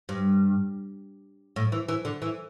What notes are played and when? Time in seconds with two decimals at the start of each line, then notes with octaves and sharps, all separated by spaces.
0.09 G2
1.56 A2
1.72 E3
1.88 E3
2.05 D3
2.22 E3